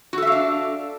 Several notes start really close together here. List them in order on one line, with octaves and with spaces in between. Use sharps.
F#4 A4 E5 F5 D4